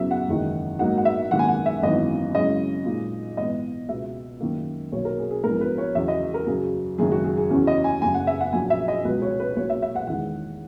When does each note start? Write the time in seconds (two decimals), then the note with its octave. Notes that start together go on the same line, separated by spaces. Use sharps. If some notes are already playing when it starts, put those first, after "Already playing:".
Already playing: F#2 C#3 F#3 B3 E4 E5
0.11 F#5
0.28 F#1 E2 D#3 G#3 D#4
0.79 G#2 F#3 A#3 D#4 F#5
0.98 F#5
1.05 E5
1.31 G#1 F#2 D#3 A#3 F#5
1.39 G#5
1.48 F#5
1.66 E5
1.83 G#1 F#2 E3 B3 D#4 D#5
2.35 F#2 C#3 G#3 C#4 E4 D#5
2.86 A#2 G#3 D#4
3.37 G#2 E3 B3 D#5
3.89 C#2 B2 G#3 B3 E5
4.40 F#2 D#3 A#3
4.92 B1 B2 F#3 A#3 C#5
5.05 A#4
5.18 G#4
5.31 G#4
5.44 A#1 G#2 F#3 B3 E4 A#4
5.61 B4
5.78 C#5
5.95 E2 C#3 F#3 E5
6.08 D#5
6.34 A#4
6.46 F#2 C#3 F#3 G#4
6.98 F#1 F#2 D#3 G#3 G#4
7.12 F#4
7.24 G#4
7.37 G#4
7.50 E2 C#3 F#3 C#4 E4
7.67 D#5
7.84 G#5
8.02 F#1 F#2 C#3 G#5
8.14 F#5
8.27 E5
8.40 F#5
8.53 A#1 A#2 F#3 G#5
8.70 E5
8.88 D#5
9.04 C#2 B2 F#3 B4
9.22 C#5
9.40 B4
9.56 B1 B2 A#3 C#5
9.70 E5
9.82 E5
9.95 F#5
10.07 E2 D#3 G#3 F#5